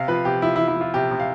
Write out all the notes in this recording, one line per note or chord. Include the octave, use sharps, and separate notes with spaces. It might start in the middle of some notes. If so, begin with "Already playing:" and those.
Already playing: C3 F5
F3 B4
C3 G4
F3 E4
E4
F3
E4
F3 F4
C3 G4
C3
F5